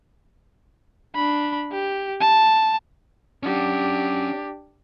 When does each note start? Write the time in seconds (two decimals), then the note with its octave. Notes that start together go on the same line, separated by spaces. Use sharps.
1.15 D4 B5
1.72 G4
2.21 A5
3.43 C#4 D4 G4 F#5